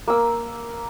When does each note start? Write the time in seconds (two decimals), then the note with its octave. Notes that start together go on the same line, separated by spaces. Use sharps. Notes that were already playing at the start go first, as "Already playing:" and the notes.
0.08 A#3 E6